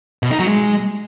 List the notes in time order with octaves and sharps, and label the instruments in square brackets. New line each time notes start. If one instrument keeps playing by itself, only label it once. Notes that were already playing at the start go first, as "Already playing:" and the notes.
[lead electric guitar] B2
D#4
F#3
G#3